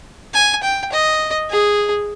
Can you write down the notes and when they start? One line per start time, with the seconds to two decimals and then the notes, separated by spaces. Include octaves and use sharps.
0.34 G#5
0.63 G5
0.92 D#5
1.50 G#4